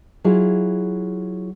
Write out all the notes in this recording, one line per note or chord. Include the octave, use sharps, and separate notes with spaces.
F#3 E4 F4 G#4